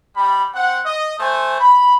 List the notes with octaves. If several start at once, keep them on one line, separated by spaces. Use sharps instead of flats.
G3 B5
C4 F#5
D#5
A3 C5 G#5
B5